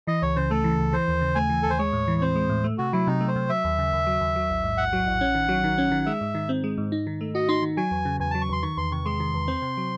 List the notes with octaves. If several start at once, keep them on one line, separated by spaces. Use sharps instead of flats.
E3 D#5
C#2 C#5
C#3 C5
A3 A4
E3
C#2
E3 C5
D#2
C#3
A3 G#5
E3
D#2 A4
C5
G#3 C#5
A2
E3
C4 C5
G#3
A2
A3
C3 F#4
F#3 E4
C3 D#4
A3
C5
C3
F#3 E5
D#2
C#3
D#2
F#3
D#2
F#3
A1
G#2
A1 F#5
F#3
A1
C#4
D#3
F#3
D#3
C#4
D#3
G#3 E5
G#2
D#3
C4
G#3
G#2
D#4
D#3
A3
F#4 D#5
D#4 C6
D#3
F#3 G#5
E2
C#3
E2 G#5
F#3 A5
C#6
E2 C6
D#3 C#6
E2 C6
C3 C#6
G#3 C6
D#3
E2
C4
C3
F#3